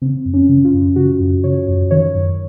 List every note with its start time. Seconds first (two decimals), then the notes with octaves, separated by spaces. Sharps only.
0.02 C#3 C4
0.26 F#2
0.34 C#4
0.49 C#3
0.65 F4
0.74 F#2
0.96 C#3 F#4
1.20 F#2
1.44 C#3 C#5
1.68 F#2
1.91 D#3 C#5
2.15 F#2